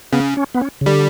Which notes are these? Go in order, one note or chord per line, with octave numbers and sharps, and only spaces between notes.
C#3 B3
C#4
B3
C#4
C#3
D3 G3